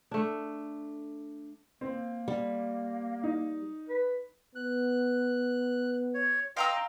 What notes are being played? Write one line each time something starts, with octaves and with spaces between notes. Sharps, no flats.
A3 D4
A#3 C4
G3
D#4
B4
B3 F#6
C#5
D#5 F5 G5 A#5 C6 E6